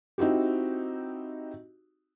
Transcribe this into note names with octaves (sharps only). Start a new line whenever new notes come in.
C4 D#4 E4 F#4 G4